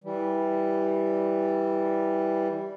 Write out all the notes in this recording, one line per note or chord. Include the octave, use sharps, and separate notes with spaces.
E3 G3